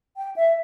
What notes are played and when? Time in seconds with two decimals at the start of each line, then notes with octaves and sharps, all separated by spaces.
0.17 G5
0.36 E5